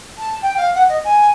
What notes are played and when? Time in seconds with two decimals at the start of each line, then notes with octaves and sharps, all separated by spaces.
0.18 A5
0.42 G5
0.57 F5
0.75 F#5
0.89 D#5
1.04 G#5